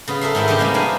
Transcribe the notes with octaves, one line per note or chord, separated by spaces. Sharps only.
C#3 B3
A4 A#4 E5 C6
G#2 D#3 E4 E5
C#3 B3 D4 D#4 G4 A#4
C3 G3 G#3 A#3
B3 D4 F#4 F5 G#5